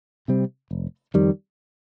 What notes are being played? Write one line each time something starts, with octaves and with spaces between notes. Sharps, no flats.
C3 G3 C4
F1
F2 D#3 G3